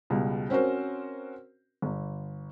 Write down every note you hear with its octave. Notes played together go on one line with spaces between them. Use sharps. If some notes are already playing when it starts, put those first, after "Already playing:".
C#2 B2 G3
C4 C#4 F#4 A#4 C5
G1